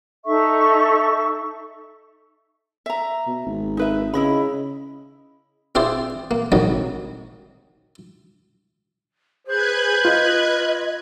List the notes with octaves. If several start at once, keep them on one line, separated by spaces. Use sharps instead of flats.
D#4 A4 E5 C#6
E5 A#5
B2
G#1
D#4 B4 E5
C#3 E4 D#5 B5
C4 E4 F4 G#4 C5 D5
A#3
C2 F2 G#2 D#3 F#3
G#4 B4 C5 F#6 G#6
F4 D#5